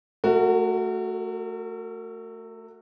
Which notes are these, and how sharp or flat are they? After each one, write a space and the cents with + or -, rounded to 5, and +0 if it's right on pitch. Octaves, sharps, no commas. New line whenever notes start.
A3 +0 F#4 +0 A#4 -40